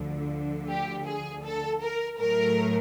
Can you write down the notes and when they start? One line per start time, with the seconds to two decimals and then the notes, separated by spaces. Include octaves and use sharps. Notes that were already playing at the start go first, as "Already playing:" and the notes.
Already playing: D2 D3 F3
0.68 G4
1.06 G#4
1.44 A4
1.81 A#4
2.19 A2 F#3 A3 A#4